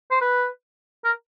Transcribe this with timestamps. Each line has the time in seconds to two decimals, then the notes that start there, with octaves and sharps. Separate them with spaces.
0.11 C5
0.21 B4
1.05 A#4